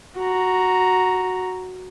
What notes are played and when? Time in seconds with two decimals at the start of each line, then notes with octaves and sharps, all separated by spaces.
0.17 F#4 A#5